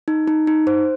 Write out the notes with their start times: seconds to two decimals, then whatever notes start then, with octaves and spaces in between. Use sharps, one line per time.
0.08 D#4
0.27 D#4
0.47 D#4
0.67 C5